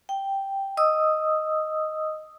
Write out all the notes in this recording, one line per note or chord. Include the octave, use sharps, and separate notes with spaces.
G5
D#5 D#6 E6